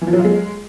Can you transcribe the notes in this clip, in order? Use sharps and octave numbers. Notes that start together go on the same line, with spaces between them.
E3
F3
F#3
F4
G#3